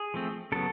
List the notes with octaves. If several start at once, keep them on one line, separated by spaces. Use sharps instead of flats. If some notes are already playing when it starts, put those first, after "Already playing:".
Already playing: G#4
F3 A3 C4
C#3 F#3 B3 A4